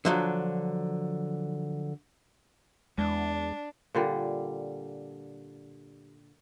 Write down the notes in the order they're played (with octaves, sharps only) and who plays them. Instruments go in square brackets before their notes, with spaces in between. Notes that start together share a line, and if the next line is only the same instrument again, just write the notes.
[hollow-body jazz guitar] D3 F3 F#3
[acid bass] E2 [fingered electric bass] G#3 [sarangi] D4
[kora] A#2 D3 G3